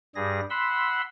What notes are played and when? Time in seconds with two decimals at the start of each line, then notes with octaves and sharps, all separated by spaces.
0.15 G2 G3 G#4 A#6
0.50 F#5 B5 C6 E6